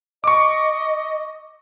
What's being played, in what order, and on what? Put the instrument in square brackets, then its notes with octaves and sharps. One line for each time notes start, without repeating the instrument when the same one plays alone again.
[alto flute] D#5 [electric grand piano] C#6 D6